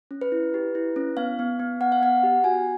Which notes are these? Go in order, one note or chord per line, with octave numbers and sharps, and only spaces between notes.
C#4
B4
E4
G4
E4
C#4
B3 F5
B3
B3
B3 F#5
F5
B3 F#5
G4
F#4 G#5